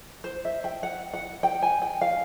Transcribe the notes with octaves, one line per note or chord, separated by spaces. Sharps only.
C5
E5
G5
F#5
F#5
G5
G#5
G5
F5